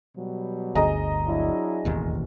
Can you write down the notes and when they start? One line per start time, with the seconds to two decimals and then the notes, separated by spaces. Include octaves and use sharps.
0.16 B2 F#3 G3
0.75 G1 D2 G#4 D#5 A#5
1.26 F#3 D4 E4
1.85 E1 A1 D#2